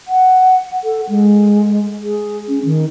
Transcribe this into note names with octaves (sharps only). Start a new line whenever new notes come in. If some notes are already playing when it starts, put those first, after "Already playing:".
F#5
A4
G#3
G#4
C#4
D#3